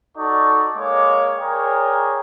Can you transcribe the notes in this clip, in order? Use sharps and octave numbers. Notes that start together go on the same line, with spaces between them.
D#4 F#4 A4 D5 A5 C#6
G#3 A#3 C#5 D6
G#4 A#4 C#5 D5 G5